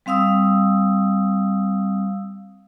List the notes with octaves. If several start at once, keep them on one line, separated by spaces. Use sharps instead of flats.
G3 C4 F5 D#6 E6